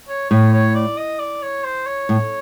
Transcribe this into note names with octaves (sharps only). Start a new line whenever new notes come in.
C#5
A2 C#5
C#5
D5
D#5
D5
C#5
C5
C#5
A2